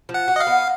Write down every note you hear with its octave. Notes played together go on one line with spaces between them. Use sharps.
F3
F#5
F#4
D#5
F5
B3